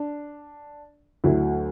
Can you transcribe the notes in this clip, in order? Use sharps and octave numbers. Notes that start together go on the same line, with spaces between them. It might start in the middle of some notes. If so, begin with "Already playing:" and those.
Already playing: D4
D2 D3 F#3 E4